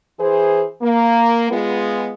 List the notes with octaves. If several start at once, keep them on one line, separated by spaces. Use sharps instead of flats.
E3 G#4 C5
A#3
G#3 B3 F4